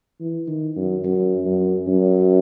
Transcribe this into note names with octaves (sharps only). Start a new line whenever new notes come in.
E3
D#3
F#2
F#2
F#2
F#2